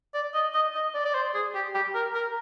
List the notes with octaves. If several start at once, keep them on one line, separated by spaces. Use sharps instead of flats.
D5
D#5
D#5
D#5
D5
D5
C5
G#4
G4
G4
A#4
A#4